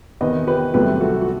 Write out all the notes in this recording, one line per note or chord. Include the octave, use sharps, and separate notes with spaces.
E2 C3 D#3 B4 D#5
G4 B4
C2 C3 D#3 F#3 A3 G4 B4
F#4 A4
F#4